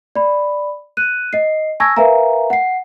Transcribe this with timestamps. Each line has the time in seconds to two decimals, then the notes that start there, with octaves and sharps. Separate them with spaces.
0.16 D5 B5
0.97 F#6 D#7
1.33 D#5 C7
1.80 G#5 A5 C#6 E6 G#6 A#6
1.97 A#4 B4 E5 F5 G#5 A#5
2.50 F#5 C7